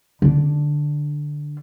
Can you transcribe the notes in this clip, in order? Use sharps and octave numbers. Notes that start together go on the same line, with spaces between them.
D3 D4